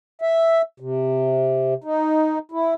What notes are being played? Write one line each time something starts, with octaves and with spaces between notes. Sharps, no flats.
E5
C3
D#4
E4